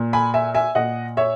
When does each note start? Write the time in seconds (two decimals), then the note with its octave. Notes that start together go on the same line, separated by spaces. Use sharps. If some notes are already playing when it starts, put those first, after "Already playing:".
Already playing: A#2
0.13 G#5 B5
0.34 E5 G#5
0.54 E5 G#5
0.75 A#2 D#5 F#5
1.17 C#5 E5